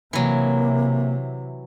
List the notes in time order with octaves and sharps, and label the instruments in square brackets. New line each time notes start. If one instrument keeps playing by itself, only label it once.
[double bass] C3 [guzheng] E3 F#3 [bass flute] A#3